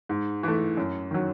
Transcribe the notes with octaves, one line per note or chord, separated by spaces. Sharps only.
G#2
E3 A3
F#2
D#3 F#3